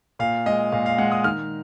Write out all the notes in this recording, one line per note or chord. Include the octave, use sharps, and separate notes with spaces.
A#2 F5
G#3 D#5
A#2 F5
F5
G#3 F#5
D#6
D#3 F6